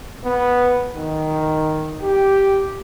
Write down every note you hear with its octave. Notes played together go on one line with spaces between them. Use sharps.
B3
D#3
G4